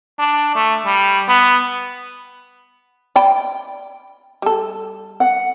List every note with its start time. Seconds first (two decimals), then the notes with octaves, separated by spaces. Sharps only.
0.19 D4
0.55 A3
0.86 G3
1.29 B3
3.16 D5 G5 B5
4.42 G3 A4
5.20 F#5